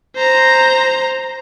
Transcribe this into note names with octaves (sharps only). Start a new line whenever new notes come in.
C5 A#5